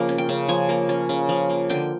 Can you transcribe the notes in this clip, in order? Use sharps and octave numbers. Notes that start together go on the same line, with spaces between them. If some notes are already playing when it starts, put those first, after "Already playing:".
Already playing: C#3 F3 A#3
C#4
G5
C#3
F3 G#5
A#3
C#4
C#3
F3
A#3
D3 G5